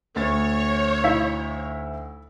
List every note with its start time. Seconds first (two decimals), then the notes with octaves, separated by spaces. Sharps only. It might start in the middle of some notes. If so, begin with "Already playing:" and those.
0.16 D2 C#5 A6
1.04 D#4 E4 E5 F5